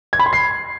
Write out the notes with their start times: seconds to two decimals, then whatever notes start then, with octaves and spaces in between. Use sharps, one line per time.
0.13 G#6
0.19 B5
0.26 C6
0.33 C7